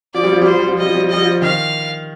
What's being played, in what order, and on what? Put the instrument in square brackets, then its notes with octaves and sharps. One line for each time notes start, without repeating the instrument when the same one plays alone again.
[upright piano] F3 [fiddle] D5
[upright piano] G3
F3
G3
[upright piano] F3 [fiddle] C5
[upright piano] G3
F3
[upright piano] G3 [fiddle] D#5
[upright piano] F3
G3
F3
[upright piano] G3 [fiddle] D#5
[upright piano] F3
[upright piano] D#3 [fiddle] F5